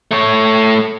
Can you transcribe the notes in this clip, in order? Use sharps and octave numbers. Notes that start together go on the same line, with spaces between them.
A3 C#5